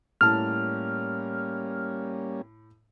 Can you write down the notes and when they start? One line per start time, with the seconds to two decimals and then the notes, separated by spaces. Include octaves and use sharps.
0.21 A2 G3 A#3 C#4 A5 F6